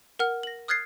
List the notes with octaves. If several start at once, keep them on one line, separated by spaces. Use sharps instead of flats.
A#4 F#5 F6
A#6 F#7
D#6 F6 F#6 G#6 A6 C7